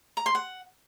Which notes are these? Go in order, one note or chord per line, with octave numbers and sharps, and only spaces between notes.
A#5
C6
F#5